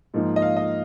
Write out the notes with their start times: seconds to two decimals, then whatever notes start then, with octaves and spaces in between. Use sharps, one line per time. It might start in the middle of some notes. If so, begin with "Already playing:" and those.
0.14 G#2 F3 A#3 D#4
0.36 D#5
0.42 F5
0.56 D#5